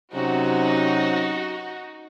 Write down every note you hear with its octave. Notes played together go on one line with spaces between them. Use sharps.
C3 F#3 C#4 D#4 F#4